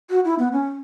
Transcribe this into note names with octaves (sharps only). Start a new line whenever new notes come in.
F#4
E4
B3
C#4